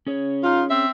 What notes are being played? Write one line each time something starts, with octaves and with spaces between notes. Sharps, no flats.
C#4 G#4 C#5
D#4 F4
C4 E5